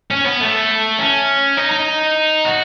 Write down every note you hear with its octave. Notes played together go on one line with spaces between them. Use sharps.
C#4
B3
A3
C#4
D#4
D#4
F#4